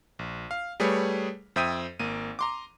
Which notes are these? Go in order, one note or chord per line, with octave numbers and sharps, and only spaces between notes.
A#1
F5
G3 A3 G#4 B4 C#5
F2 C5 E5 G5 D#6 D#7
G#1 A#3 D#7
A#5 C6 D6